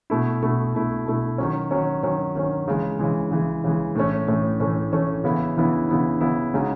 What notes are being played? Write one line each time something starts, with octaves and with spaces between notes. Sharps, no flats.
B2 A3 E4
B2 A3 E4
B2 A3 E4
B2 A3 E4
D#3 F#3 C#4
D#3 F#3 C#4
D#3 F#3 C#4
D#3 F#3 C#4
C#3 E3 G#3
C#3 E3 G#3
C#3 E3 G#3
C#3 E3 G#3
A2 E3 A3 C#4
A2 E3 A3 C#4
A2 E3 A3 C#4
A2 E3 A3 C#4
C#3 E3 B3 E4
C#3 E3 B3 E4
C#3 E3 B3 E4
C#3 E3 B3 E4
C#3 G#3 D#4 F#4